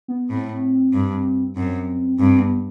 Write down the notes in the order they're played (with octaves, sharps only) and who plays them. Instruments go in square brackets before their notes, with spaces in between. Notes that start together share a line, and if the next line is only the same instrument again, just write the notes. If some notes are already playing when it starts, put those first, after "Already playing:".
[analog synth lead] B3
[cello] A2 [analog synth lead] C4
[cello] G2
[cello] F#2 [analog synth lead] C4
[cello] G2 [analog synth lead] C4
[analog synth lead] B3